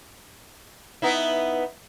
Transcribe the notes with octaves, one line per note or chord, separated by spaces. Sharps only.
B3 D#4 E4